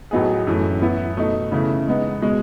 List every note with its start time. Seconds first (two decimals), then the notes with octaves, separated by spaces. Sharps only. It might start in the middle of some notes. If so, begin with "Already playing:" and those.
0.11 A2 F#3 B3 D#4 G#4
0.47 F#2 E3 A3
0.82 E3 B3 E4
1.17 B2 A3 D#4
1.52 C#3 E3 A3 E4
1.87 G#3 B3 D#4
2.22 B2 G#3